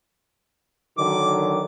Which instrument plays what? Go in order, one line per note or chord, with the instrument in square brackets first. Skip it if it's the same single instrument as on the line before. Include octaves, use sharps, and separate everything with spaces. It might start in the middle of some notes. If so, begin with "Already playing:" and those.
[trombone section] D3 D#3 F#3 [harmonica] D6